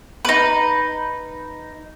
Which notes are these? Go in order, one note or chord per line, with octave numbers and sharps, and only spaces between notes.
D#4 B4